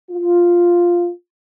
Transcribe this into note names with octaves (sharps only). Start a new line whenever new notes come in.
F4